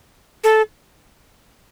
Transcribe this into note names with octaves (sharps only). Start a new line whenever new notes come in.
A4